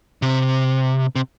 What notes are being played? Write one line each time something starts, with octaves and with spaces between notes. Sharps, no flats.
C3
C3